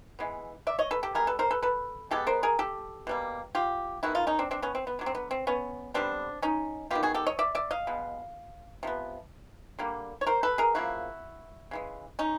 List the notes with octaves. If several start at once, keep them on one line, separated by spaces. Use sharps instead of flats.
E3 G#3 B3
D5 E5
C#5 D#5
A4 B4
G4 A4
E3 G3 B3 G#4 A#4
A4 B4
A#4 C5
A4 B4
A4 B4
B2 G#3 B3 G4 A4
A#4 C5
G#4 A#4
G4 A4
B2 G3 A#3
F4 G4
D#3 G#3 B3 E4 F#4
D#4 F4
C#4 D#4
C4 D4
C4 D4
B3 C#4
C4
B3
D3 F#3 B3
C4
B3
C4
B3 C#4
D3 G3 B3 C4 D4
C#4 D#4
D#3 G#3 B3 F4 G4
F#4 G#4
G4 A4
C#5 D#5
D5 E5
D5 E5
D#5 F5
B2 G#3 B3
C3 F3 B3
D3 G3 A#3
C#5
A#4 C5
A4 B4
G#4 A#4
C#3 F3 A#3 E4 F#4
C#3 E3 G#3
C#4 D#4